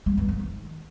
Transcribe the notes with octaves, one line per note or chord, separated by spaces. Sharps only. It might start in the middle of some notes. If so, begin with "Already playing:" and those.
G#3
G2
F3
D#3